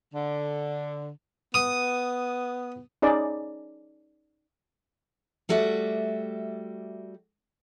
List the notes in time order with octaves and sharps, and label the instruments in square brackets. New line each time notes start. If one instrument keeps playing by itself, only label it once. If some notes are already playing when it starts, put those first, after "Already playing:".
[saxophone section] D3
[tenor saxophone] B3 [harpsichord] D#6
[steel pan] C#4 D#4 G#4 D5
[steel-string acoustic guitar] G3 A3 F#4 D5 E5